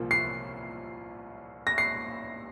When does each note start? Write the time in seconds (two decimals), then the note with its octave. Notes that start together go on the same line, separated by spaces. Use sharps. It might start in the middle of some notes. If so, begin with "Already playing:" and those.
Already playing: C2 A#2 F3 A#3
0.11 C7
1.67 A#6
1.78 C7